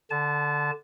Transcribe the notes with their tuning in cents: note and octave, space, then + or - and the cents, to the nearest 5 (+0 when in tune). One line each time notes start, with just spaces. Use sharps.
D3 +0 A5 -30